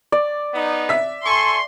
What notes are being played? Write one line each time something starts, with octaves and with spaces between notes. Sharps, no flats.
D5
B3 D#4
E5 B6
A4 G#5 C6 C#6